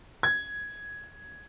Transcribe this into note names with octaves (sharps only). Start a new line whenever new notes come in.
G#6